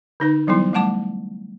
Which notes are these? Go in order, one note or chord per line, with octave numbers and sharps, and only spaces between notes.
D3 D#4 B4
E3 F#3 G3 B3 E4
G3 A3 F#5 A5 D6